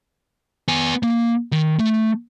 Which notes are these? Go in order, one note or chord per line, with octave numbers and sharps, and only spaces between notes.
B3 G#5
A#3
D#3
A3